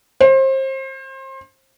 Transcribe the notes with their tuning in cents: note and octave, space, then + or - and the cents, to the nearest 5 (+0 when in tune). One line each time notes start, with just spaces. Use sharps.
C5 +30